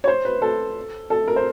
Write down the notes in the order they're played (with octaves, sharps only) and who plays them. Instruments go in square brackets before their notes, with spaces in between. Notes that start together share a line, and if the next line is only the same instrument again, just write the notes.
[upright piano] C#5
C5
B4
A4
A4
A#4
C5